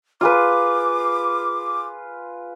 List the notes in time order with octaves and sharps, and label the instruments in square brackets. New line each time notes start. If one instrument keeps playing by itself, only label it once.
[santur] F4 G#4 B4 [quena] D6